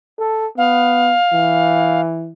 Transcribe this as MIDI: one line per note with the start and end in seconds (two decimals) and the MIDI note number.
0.19 0.47 69
0.58 1.16 59
0.58 2.01 77
1.33 2.32 52